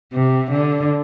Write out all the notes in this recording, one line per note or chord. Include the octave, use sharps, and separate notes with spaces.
C3
D3